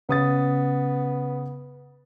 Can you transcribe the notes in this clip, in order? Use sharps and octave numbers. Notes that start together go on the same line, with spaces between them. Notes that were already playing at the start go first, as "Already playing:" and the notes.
C#3 B3 D#6 A6